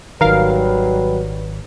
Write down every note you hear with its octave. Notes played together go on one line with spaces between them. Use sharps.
G#1 D#3 F#3 G3 A#4 B4 F5